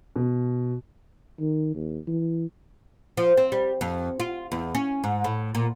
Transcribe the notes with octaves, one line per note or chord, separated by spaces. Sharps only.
B2
D#3
D#2
E3
F3
C4
G3
F2
F4
E2
C#4
G#2
A2
A#2